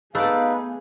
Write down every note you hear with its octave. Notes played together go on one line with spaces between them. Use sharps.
A3 B3 D#4 G#4 B4 D5 F5